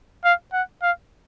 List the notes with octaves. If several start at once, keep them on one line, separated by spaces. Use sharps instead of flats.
F5
F#5
F5